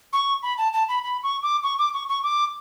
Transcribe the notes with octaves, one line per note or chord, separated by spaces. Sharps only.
C#6
B5
A5
A5
B5
B5
C#6
D6
C#6
D6
C#6
C#6
D6